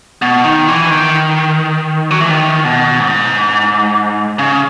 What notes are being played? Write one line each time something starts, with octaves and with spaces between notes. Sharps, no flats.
B2
D#3
E3
D#3
F#3
E3
D#3
B2
G#2
C#3